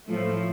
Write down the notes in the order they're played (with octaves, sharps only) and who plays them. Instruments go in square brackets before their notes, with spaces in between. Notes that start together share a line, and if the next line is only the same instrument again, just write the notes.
[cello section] A2 F3 A3